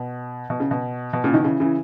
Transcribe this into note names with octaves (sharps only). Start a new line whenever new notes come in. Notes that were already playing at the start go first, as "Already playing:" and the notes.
Already playing: B2
B2
C#3
B2
B2
A#2 C#3
B2 D#3
C#3 E3
C#3 E3